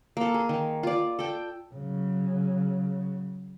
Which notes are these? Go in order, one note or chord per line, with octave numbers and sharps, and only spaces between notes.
A#3 A4
G#4
D#3
F4 D5
A4 G5
C#3 F#3